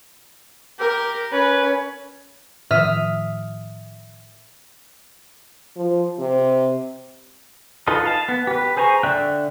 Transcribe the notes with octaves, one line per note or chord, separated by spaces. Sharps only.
G4 A#4
C#4 B4
A2 D#3 F3 E5 D#6 F6
F3
C3
D#4 F4 A4 B4 D#5
F5 A5
B3
G4 B4
G#4 C5 G#5 A#5 C#6
D3 D5 E5 G5 F#6